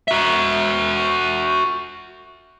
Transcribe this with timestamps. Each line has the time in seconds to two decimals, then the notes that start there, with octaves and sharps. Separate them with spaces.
0.08 F#4 E5